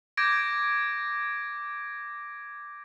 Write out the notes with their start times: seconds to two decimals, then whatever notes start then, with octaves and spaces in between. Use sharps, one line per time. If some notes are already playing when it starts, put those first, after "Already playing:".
0.17 D6 G6 G#6 A#6 D7